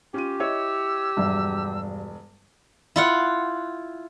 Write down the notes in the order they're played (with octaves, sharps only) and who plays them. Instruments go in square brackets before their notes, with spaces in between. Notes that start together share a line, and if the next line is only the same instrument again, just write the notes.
[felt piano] C#4 F4 D#7 [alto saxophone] G4
[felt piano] E4 C#5 D#5 [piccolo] E6
[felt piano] E1 F#3 E5 [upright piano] G2
[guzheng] E4 F4 F#5